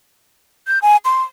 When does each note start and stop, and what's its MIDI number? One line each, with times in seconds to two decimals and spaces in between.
0.67 0.79 91
0.82 0.97 80
1.05 1.22 84